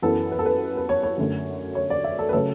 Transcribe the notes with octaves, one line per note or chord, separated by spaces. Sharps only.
F#2 E3 B3 A4
B4
A4
B4
B4
C#5
C#5
F#2 D3 A3 C#4
C#5
D5
E5
A4
B4
C#3 F#3 A3 C#4 A4